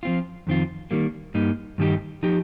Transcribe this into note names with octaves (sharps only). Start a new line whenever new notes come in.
F3 C4 F4
F2 D#3 C4 F4
D#3 G3 A#3
G2 G3 A#3 D#4
G2 D#3 G3 D#4 G4
F3 D#4 G4